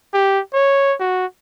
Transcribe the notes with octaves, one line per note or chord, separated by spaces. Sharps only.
G4
C#5
F#4